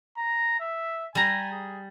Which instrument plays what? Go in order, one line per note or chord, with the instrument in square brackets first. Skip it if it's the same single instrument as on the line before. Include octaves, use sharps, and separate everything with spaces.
[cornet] A#5
E5
[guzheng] G3 A#5 [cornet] G#5
[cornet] G#4